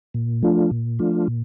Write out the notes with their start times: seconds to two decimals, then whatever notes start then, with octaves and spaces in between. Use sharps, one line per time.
0.14 A#2
0.43 F3 A3 D4 F4
0.71 A#2
0.99 F3 A3 D4 F4
1.27 A#2